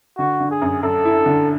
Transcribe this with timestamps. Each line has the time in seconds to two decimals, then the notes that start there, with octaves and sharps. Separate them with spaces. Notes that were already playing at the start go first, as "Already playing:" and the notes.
0.18 D3 F#4
0.40 D3
0.51 G#4
0.62 F#2
0.83 F#2 A4
1.05 E4
1.26 D3